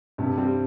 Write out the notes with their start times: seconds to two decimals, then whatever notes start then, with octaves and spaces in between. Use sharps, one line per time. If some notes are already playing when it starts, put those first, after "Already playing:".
0.18 G2 C3
0.37 G3 C4